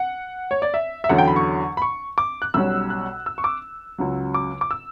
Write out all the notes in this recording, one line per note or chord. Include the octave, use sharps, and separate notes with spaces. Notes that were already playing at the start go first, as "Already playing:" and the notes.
Already playing: F#5
C#5
D5
E5
E5
E2 D3 F#3 C#4 F#5
G5
B5
C#6
B5
C#6
D6
F#6
B1 B2 G3 C#4 E6
F#6
E6
C#6
D6
C#2 C#3 F#3
D6
D6
E6